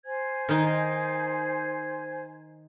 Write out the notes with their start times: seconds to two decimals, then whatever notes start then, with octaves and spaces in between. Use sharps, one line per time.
0.05 C5 G#5 G#6
0.49 D#3 D#4